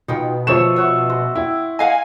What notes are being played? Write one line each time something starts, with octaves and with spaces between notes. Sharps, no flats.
B2 D#4 F4 G5
F3 C#5 E5 C#6 E7
C#5 E5 F#5 C#6
F#4 C6
E4 G5
D#5 F5 F#5 G#5